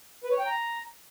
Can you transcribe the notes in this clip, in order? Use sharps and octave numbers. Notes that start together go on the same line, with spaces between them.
B4
C#5
G5
A#5